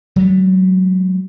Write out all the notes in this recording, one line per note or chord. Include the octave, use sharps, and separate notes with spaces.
F#3 G#3 A3